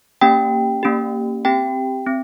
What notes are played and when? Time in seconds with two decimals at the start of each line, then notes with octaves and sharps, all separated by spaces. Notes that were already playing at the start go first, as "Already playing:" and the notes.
0.21 A#3 C#4 G4 G5
0.83 A#3 C#4 G4
1.45 C4 G4 G5
2.07 C4